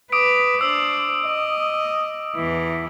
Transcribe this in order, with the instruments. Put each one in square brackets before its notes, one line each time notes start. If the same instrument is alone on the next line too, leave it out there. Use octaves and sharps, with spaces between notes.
[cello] B4 [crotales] D6 D#6 D7
[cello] D4 C5 [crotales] E6
[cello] D#5
E2 E3